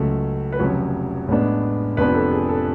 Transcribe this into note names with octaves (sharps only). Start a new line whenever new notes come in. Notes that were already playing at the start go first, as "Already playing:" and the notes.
Already playing: C#2 C#3 F#3 A3
B4
F1 F2 C#3 F#3 C#5
A1 A2 G#3 B3 D4
F1 F2 F3 B3 D4 B4
A4
G#4
A4